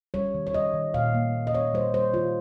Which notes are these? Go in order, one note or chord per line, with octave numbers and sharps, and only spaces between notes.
G3 C#5
D#3
C#5
G3 D#5
D#3
A#2 F5
A#3
A#2
D#5
A#3 C#5
G3 C5
G3 C5
D#3 F4